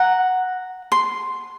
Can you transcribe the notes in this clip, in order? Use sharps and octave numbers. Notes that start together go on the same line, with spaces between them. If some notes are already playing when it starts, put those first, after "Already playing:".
Already playing: F#5 A#5
C6